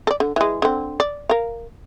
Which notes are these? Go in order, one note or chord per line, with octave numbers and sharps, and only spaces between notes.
A4 D5
D3
E3 G#3
D3 C4
D5
A#4 F5